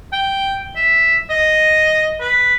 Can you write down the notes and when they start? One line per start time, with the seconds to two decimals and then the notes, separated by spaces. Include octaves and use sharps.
0.13 G5
0.76 E5
1.30 D#5
2.20 B4